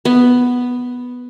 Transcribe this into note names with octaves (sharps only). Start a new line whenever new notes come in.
B3